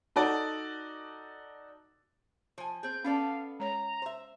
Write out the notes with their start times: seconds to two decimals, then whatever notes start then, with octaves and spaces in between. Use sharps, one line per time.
0.16 D#4 F#4 A4 D5 A5
2.58 F3 G#5
2.83 C4 G#4 G6
3.04 B3 C#4 A4 D5 F5
3.60 G#3 C#5 A#5
4.02 C5 E5